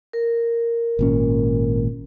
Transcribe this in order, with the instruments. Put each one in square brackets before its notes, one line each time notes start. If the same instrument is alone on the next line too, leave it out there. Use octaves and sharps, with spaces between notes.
[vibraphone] A#4
[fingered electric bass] G#1 A#2 C#4